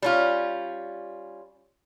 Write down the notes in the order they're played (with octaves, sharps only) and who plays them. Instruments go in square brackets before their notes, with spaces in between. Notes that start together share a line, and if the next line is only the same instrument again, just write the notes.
[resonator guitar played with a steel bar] G3 C#4 F4